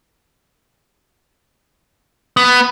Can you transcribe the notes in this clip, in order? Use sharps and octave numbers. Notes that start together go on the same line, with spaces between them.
B3